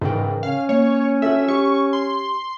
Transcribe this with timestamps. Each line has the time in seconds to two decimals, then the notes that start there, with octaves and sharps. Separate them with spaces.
0.01 G#2 C#3 E3 A#4 G5
0.43 C#4 F5
0.69 A#3 C#5
1.22 F#4 A4 E5
1.48 G4 C#6
1.93 C6